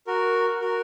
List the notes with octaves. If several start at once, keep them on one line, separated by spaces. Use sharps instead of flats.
F#4 A#4
F#4 A#4